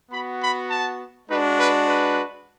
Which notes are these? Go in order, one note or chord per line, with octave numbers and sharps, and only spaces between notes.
B3 F#4 B5
B5
A5
G#3 D4 F#4 B4
B4
B4